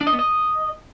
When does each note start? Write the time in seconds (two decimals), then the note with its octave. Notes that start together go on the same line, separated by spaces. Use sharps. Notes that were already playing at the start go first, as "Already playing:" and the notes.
0.01 D4
0.07 D#5
0.13 B3
0.19 D#5